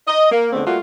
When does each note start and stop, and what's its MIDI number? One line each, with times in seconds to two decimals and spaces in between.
0.08 0.30 75
0.32 0.50 58
0.53 0.63 41
0.53 0.63 50
0.53 0.63 56
0.53 0.63 57
0.53 0.63 59
0.53 0.63 60
0.66 0.78 55
0.66 0.78 57
0.66 0.78 58
0.66 0.78 65
0.66 0.78 66